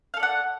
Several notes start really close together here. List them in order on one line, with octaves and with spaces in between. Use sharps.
F5 A4 D5 F#5